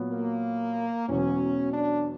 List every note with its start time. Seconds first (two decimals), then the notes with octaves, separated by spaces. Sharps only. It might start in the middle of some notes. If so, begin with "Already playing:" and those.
Already playing: A#2 F#3 B3
0.10 A#3
1.08 E1 E2 B2 F#3 C#4
1.74 D4